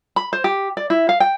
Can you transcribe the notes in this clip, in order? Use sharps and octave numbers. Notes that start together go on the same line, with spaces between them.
B5
C5
G4
D5
E4
F5
G5